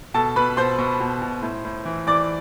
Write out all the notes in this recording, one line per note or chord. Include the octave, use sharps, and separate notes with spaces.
B2 A4 A5
B2 B4 B5
B2 C5 C6
B2
B2
B2
A2
A2
E3
E3 D5 D6